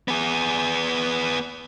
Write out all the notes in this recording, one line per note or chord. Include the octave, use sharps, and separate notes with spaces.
B3 G#4